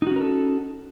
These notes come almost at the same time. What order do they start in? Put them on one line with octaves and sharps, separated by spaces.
D#4 F#4 C#4 A#4 A4